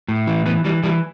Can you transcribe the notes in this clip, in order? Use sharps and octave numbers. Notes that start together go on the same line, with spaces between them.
A2
E3
E3 B3
E3 G3
E3 G3